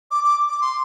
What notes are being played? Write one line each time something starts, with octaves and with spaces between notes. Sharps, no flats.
D6
D6
D6
C6